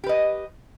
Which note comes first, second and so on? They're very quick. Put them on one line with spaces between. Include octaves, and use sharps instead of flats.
G4 B4 D#5